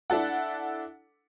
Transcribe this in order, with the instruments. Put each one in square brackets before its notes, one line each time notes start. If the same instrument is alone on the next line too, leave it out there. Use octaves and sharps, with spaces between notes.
[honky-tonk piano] D4 E4 A4 F#5